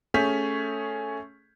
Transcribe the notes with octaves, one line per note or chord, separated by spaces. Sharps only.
A3 C#4 G#4 G6 B6